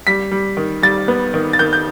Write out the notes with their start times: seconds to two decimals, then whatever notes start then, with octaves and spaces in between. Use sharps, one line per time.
0.07 G3 B6
0.31 G3
0.57 D#3
0.82 G3 A6
1.08 B3
1.34 D#3
1.53 A6
1.59 D#3 G6
1.73 G6